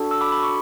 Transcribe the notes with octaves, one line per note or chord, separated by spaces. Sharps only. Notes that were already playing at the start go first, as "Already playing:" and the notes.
Already playing: D4 F#4 A4
E6
B5 D6
B5
C#6